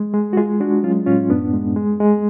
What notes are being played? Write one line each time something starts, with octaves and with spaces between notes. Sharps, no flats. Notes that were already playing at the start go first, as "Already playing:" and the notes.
Already playing: G#3
G#3
F#4
G#3 F4 G#4
G#3 D4 F#4
F#3 C#4 F4
A2 C#4 F4
F#2 B3 D4
G#3
G#3
G#3